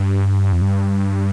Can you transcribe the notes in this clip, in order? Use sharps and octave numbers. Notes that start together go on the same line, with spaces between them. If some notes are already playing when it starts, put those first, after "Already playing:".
Already playing: G2
F2
G2